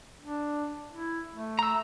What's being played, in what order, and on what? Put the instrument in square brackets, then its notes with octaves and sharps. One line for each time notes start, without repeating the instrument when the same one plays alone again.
[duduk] D4
E4
A3
[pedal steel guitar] A#5 E6